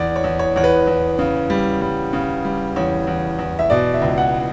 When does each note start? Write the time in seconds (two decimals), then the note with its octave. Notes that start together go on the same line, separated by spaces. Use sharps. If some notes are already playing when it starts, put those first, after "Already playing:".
Already playing: E2 D5
0.16 C#5
0.24 E2
0.39 C#5
0.56 E2 C#5
0.64 B4
0.87 E2
1.18 C#3
1.50 G3
1.81 G3
2.13 C#3
2.45 G3
2.76 E2 C#5
3.07 E2
3.39 E2
3.59 E5
3.70 B2 D5
3.94 E5
4.02 C#2
4.18 F#5